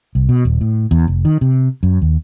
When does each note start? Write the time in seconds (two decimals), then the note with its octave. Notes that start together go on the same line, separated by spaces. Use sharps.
0.15 C2
0.29 B2
0.45 D#1
0.61 A2
0.91 E2
1.08 F1
1.25 D#3
1.41 C3
1.83 F#2
2.02 D#2